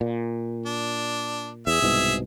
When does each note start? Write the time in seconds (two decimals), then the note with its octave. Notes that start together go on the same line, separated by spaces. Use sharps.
0.01 A#2
0.66 D4
1.67 E2 G#4 E5
1.82 C2 G#2 B2